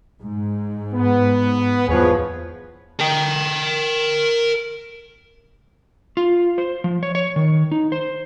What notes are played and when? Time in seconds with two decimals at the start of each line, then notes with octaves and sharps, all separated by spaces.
0.21 G#2
0.93 B3
1.88 E2 F3 G#4 B4 C#5
3.00 A#4 G5
6.17 F4
6.58 C5
6.84 F3
7.03 C#5
7.15 C#5
7.36 D#3
7.72 D#4
7.92 C5